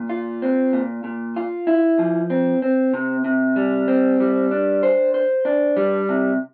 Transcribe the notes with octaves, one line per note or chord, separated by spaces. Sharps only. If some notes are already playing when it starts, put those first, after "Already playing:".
Already playing: A#2
F4
C4
A#2
A#2
F4
E4
F3
C4
C4
C3
C3
G3
C4
G3
D4
C5
C5
D4
G3
C3